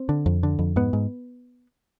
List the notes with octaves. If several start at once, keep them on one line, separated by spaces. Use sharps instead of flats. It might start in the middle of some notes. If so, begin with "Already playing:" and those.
Already playing: C4
D3
F2
D3
F2
G#2 B3
G#2